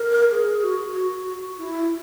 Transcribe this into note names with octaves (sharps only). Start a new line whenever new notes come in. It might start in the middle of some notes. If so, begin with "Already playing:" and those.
Already playing: A#4
G#4
F#4
F#4
E4